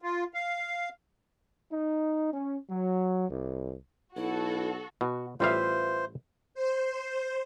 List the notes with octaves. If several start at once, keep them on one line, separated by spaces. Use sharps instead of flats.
F4
F5
D#4
C#4
F#3
C2
B1 E4 F#4 A4
B2 F#4
A1 G3 F4 B4 C5 E5 F5
C5